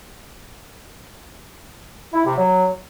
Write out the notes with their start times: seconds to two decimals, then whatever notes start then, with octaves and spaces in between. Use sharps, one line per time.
2.14 E4
2.25 C3
2.37 F#3